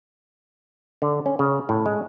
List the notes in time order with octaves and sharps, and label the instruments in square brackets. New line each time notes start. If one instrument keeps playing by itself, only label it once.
[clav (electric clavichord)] D3
C#4
C#3
A2
G#3